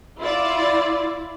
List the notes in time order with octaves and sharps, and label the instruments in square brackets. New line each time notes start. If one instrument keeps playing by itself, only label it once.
[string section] E4 F4 D5